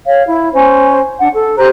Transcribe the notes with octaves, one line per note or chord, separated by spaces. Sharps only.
C#5 F5
E4
C#4 C5
D4 F#5
A4
G4 C5 A#5 F#6